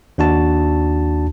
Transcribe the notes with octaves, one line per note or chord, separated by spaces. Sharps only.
D#2 D4 F#4 A5